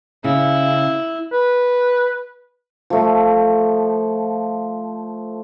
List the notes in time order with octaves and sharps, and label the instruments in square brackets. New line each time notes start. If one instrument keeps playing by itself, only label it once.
[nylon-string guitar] C#3 [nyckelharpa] E4
[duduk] B4
[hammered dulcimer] F3 A3